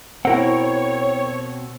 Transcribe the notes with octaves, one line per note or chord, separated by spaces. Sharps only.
B2 C4 E4 A#4 C5 C#5 F#5 G5